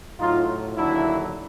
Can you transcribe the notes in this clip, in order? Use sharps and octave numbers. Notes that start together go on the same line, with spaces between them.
A2 F#3 D#4 F4
D#2 D3 F#3 D4 E4